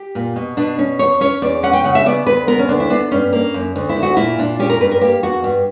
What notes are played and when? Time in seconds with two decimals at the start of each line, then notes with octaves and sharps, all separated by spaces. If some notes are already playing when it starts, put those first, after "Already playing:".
Already playing: G4
0.15 A#2
0.36 B2
0.57 B2 D4
0.79 C#4
0.99 E2 C#5
1.21 C#4 C#5
1.42 E2 D5
1.63 C#4 F#5
1.73 G5
1.84 C#3 F#5
1.95 E5
2.06 B3 D5
2.26 D2 B4
2.47 B3 A#4
2.59 C#4
2.69 D2 D4
2.80 E4
2.90 B3 D4
3.11 G2 C#4
3.33 A#3
3.54 F#2
3.76 D2
3.89 E4
3.96 D2
4.03 F#4
4.17 A#2 E4
4.38 A#2 D4
4.59 C#4 G4
4.70 A#4
4.80 G2 B4
4.91 A#4
5.01 A#3 G4
5.23 E2 F#4
5.44 G2